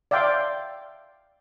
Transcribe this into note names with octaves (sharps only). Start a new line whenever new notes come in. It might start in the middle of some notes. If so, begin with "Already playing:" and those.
D5 E5 F5 G5 C6